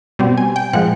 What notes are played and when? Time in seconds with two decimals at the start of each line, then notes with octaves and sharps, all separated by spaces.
0.19 B2 G3 C4
0.37 G#5
0.56 G5
0.73 A#2 F3 G#3 F#5